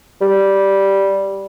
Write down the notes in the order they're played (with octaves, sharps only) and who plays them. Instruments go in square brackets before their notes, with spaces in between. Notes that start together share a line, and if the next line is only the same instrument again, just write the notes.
[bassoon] G3